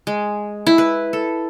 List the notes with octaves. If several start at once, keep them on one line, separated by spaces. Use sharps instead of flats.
G#3
E4
B4
A4